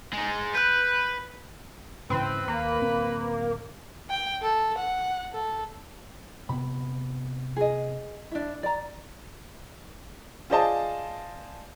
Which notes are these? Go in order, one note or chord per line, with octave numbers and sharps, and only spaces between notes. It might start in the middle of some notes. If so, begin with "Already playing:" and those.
G#3 D#4
B4 F#6 G6
G#2 C#3 E3 C4 B4
D#2 A#3
D1 C4
G5
A4
F#5
A4
C3 B3 B5
G#4 D#5
D4 E4
D5 A#5
F4 G#4 C5 D5 D#5 A5